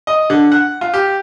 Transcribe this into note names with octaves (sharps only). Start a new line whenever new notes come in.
D#5
D3
F#5
F4
G4